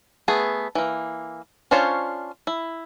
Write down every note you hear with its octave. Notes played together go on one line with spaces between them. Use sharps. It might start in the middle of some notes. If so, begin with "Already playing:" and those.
A3 B3 G#4
E3 A#3
C#4 D4 F4 C5 C#5
E4